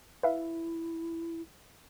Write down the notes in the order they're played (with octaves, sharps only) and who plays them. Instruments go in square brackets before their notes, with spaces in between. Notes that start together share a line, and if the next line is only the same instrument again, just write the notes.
[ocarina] E4 [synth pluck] B4 E5 F5